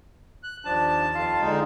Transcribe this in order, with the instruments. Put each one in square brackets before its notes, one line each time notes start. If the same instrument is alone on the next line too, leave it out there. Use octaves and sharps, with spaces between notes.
[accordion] F#6
[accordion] D#2 A5 [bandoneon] F3 D4
[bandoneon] F2 F4 F5
[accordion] D3 G#3 D#4